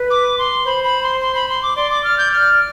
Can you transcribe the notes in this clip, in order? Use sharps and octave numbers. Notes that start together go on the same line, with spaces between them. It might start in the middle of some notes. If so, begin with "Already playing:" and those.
Already playing: B4
D6
C6
C5 B5
B5
C6
C6
B5
C6
D6
D5 C6
D6
F6
G6
F6